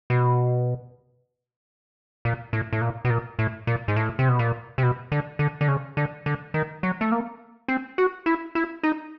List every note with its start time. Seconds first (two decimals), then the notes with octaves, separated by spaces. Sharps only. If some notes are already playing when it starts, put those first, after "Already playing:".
0.10 B2
2.25 A#2
2.53 A2
2.73 A2
2.81 A#2
3.05 B2
3.10 A#2
3.39 A2
3.67 A#2
3.88 G#2
3.96 A2
4.19 C3
4.29 B2
4.39 A#2
4.78 C3
4.83 B2
5.12 D3
5.39 D3
5.61 D3
5.68 C#3
5.97 D3
6.26 D3
6.54 D#3
6.83 F#3
7.01 A3
7.12 A#3
7.68 C4
7.98 F#4
8.26 E4
8.55 E4
8.83 D#4